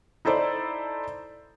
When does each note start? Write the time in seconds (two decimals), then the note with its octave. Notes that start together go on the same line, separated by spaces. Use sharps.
0.25 D#4 E4 A4 C5 D5